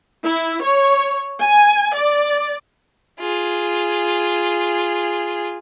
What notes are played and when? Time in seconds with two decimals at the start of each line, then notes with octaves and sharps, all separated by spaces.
0.24 E4
0.61 C#5
1.39 G#5
1.94 D5
3.20 F4 G#4